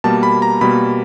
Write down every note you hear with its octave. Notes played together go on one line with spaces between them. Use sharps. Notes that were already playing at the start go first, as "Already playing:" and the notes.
B2 G3 A#3 A5
B5
A#5
B2 G3 A#3 B5